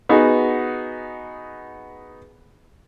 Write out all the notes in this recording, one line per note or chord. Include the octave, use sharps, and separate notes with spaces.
B3 D#4 F#4 G#4